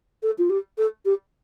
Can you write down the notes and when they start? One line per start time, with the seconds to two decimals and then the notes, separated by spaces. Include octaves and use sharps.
0.23 A4
0.38 F4
0.50 G4
0.78 A4
1.05 G4